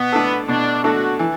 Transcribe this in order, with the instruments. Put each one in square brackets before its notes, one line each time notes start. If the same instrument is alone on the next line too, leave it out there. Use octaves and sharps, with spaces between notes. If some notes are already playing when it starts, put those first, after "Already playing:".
Already playing: [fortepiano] B2 [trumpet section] B3
[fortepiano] A3 D4 A4
[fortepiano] B2 [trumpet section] D4
[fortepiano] A3 D4 A4 [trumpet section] F#4
[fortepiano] E3